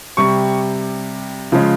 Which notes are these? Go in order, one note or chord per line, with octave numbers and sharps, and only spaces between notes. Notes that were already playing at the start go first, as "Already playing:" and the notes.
C3 G3 C#6
C#3 F3 G#3